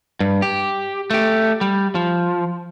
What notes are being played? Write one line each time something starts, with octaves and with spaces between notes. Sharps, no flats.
G2
G4
A3 G4
G3
F3